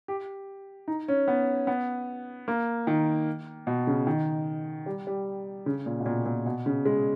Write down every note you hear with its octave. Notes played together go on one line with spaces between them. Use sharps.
G4
D#4
C#4
B3
B3
A#3
D#3
B2
C#3
D#3
G3
G3
C#3
A#2
B2
A#2
A#2
B2
C#3
G#3